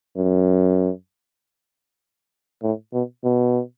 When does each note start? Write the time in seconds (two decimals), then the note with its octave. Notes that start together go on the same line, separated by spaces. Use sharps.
0.17 F#2
2.63 A2
2.93 B2
3.24 B2